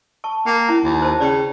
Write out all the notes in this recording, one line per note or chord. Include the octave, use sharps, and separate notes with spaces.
A5 C#6
A#3 G5
C#4 E4 A#5
D#2
C5 A5
C#3 D5 G5